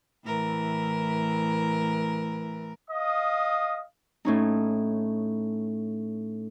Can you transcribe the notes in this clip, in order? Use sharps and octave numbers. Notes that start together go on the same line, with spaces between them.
A2 E3 A#4
D#5 F5 D#6
A2 C#4 D#4